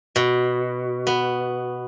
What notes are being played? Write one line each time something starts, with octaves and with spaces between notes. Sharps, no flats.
B2
B3